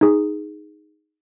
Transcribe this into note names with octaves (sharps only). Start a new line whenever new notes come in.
D#4 G#4